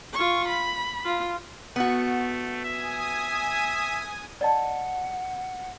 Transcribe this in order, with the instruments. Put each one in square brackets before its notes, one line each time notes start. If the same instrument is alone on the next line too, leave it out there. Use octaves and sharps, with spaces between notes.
[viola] F4 C#6
B5
F4
[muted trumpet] A3 [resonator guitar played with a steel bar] B3 F#4
[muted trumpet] E5 [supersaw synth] G#5 D#6
[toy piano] D5 D#5 A5 [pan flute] F#5